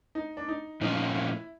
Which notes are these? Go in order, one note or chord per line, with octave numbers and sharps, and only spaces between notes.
D#4
D4
D#4
A#2 F3 A3 C#4 D#4 F4
E4